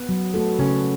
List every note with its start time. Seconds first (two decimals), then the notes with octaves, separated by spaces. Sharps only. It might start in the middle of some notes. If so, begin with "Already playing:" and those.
Already playing: B3
0.09 F#3
0.34 A3 F#4 A4
0.59 C#3 C#4